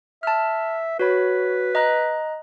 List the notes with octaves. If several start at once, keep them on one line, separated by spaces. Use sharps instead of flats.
E5 A5 F6
F#4 B4 C#5 B5
D#5 A#5 F#6